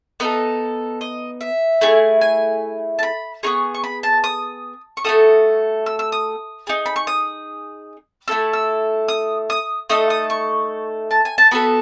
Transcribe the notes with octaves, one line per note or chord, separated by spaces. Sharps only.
B3 D#4 A4 B4
D#5
E5
A3 E4 G#4
G#5
A5
B5
B3 D#4 G#4 C#6
C#6
B5
A5
D#6
C#6
A3 D#4 F#4 A4 D#6
E6
E6
D#6
D#4 G#4
B5
C#6
D#6
A3 E4 A4 E6
E6
D#6
D#6
A3 D#4 A4 D#6
D#6
C#6
A5
G#5
A5
B3 F#4 A4 B5